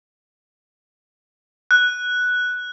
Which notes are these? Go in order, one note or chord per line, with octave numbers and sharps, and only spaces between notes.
F#6